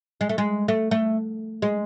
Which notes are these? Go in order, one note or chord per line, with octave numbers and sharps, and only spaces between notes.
G#3
A3
G#3
A3
A3
G#3